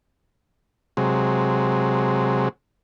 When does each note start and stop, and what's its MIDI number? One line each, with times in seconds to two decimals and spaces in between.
0.97 2.49 48
0.97 2.49 54
0.97 2.49 56